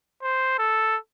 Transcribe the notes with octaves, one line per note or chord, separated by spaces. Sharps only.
C5
A4